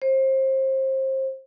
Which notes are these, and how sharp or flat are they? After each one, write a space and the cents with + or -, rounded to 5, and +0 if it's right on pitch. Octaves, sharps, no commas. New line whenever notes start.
C5 +30